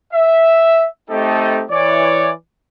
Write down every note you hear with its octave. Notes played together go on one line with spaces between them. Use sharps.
E5
A3 C4 D#4 G4 A4 D#5
E3 C#5 D5